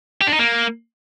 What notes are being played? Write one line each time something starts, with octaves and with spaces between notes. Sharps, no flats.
G4
D4
D#4
A#3